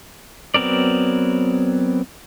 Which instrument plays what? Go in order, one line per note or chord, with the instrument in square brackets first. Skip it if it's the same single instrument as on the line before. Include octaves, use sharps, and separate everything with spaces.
[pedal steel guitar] F#3 B3 C4 A#4 D5